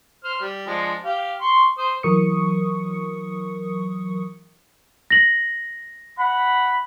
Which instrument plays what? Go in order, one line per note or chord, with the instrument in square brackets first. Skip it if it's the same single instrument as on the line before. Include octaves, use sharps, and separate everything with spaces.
[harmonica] C5 F6
G3
F3 G#3 D4
G4 F5
C6 C#6
C5 D#6
[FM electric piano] E3 F#3 A#4 C#6 D#6 C#7
[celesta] A#6 F#7
[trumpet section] F#5 B5